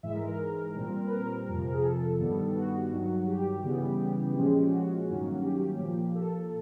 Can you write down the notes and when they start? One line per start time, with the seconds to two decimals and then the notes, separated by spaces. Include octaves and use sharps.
0.03 G#2 E3 G#3 E5
0.15 A#4
0.27 A#4
0.75 A#2 G3 C4
1.06 B4
1.11 A#4
1.47 F2 C3 F3
1.72 G#4
1.83 A4
2.19 G2 D#3 G3 B3
2.55 F#4
2.91 G2 D#3 F#3
3.27 G4
3.63 C#3 E3 G3 B3
4.35 A#2 F3 G#3 C#4
4.71 F#4
5.07 G2 D#3 F#3 A#3 C#4
5.39 F#4
5.43 G4
5.79 A#2 F3 A#3
6.15 A4